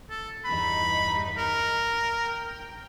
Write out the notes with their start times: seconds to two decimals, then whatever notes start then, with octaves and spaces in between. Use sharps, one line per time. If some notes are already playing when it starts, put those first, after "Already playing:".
0.10 A4
0.45 E2 G2 D#4 B5
1.38 A#4
2.22 G5